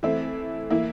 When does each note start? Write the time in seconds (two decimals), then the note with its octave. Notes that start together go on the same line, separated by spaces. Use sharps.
0.03 E3 A3 C4 E4
0.70 E3 A#3 E4